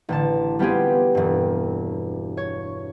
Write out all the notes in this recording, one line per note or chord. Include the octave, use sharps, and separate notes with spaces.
A1 D3 A5
G3 B3 C4 F4 G4 G#4
E1 G2
C#5